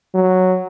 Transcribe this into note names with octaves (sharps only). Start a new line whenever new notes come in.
F#3